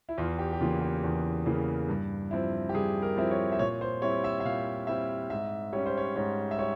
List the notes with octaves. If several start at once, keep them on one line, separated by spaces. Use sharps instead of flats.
E4
E2 F4
G4
G4
C#3 E3 A#3 F4
G4
E2
C#3 E3 A#3
G2
F3 C4 E4
G4
G2 G#4
A#4
F3 C4 E4
C#5
E5
A#2 C#5
C5
G3 C4 E4 C#5
E5
E5
A#2 F5
G3 C4 E4 E5
G#2 E5
G3 C#4 C#5
C5
C#5
G#2 C#5
E5
G3 C#5